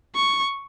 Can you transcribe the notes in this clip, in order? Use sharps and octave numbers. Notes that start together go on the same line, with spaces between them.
C#6